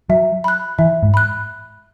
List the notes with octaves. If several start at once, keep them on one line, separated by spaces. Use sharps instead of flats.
F#3 E5
B5 F#6
E3 E5
G#2
B5 F#6